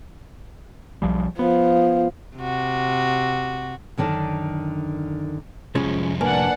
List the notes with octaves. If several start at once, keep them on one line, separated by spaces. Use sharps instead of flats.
B1 F3 G3
F3 B3
C3 F#4
F#2 D3 D#3 D4 D5
C2 F2 F3 G#3 C#4
A#3 D4 B4 D5 F#5 G#5 A5